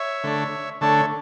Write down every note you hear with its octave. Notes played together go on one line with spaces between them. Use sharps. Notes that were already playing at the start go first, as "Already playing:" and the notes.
Already playing: C#5 E5
D3 A3 D4
D3 A3 D4 A4 C#5